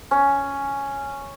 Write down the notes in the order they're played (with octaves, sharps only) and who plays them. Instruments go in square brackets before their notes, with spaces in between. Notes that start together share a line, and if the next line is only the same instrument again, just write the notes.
[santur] C#4